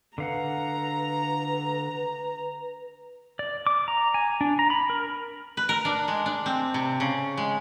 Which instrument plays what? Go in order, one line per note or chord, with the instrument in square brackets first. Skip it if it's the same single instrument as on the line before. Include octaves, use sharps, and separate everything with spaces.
[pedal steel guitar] D3 F5 F#5 [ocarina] B4 [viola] A#5
[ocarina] B4
[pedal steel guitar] D5
D6
A#5
G#5
D4
A#5
B5
A#4
[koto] B4
A#4
D4
G#3
D4
C4
C3
C#3
G#3